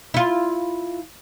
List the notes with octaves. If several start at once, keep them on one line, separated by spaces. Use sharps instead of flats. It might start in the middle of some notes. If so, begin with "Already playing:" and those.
E4 F4